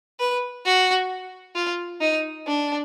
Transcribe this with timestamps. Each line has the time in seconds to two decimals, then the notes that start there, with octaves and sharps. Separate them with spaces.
0.20 B4
0.65 F#4
1.55 F4
2.01 D#4
2.47 D4